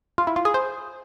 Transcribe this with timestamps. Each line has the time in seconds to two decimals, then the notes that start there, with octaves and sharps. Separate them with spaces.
0.18 F4
0.27 E4
0.36 F4
0.45 G#4
0.54 C5